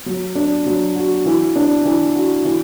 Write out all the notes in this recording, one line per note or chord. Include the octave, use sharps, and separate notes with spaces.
F#3
D4
F#3
F#4
E3
D4
E3
F#4
E3